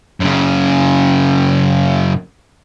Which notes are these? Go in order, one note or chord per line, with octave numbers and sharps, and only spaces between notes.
F#2 C#3